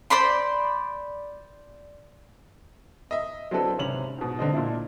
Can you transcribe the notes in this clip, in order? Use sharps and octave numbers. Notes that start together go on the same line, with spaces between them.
C5 D5 B5 C6
D#5 E5
F#3 C4 D4 E4 A4 B4
G#1 C3 C#4 F7 F#7
G#2 B2
D3 C4 D#5
A#2 D4 E4